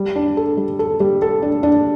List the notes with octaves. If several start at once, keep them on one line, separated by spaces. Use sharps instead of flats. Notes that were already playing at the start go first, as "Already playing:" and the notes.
Already playing: G3
D4
A4
G3
A4
G3
A4
D4
D4